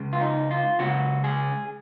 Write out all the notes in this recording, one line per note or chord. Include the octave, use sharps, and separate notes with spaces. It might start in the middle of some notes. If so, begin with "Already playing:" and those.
Already playing: C#2 C#3
F4
D#4
F4
C#2 C#3 F#4
G#4